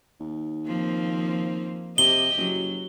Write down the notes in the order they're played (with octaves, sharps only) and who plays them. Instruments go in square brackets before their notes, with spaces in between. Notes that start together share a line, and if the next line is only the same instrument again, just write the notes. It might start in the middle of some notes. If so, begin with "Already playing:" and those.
[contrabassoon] D#2
[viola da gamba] F3 A#3 C4
[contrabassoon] C3 [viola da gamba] G4 D#5 [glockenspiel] G7
[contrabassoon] F#1 [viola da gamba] F#3